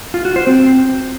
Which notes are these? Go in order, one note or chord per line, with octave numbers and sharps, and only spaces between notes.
F4
F#4
C5
C4